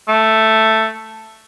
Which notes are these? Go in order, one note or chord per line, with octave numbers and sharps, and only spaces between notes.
A3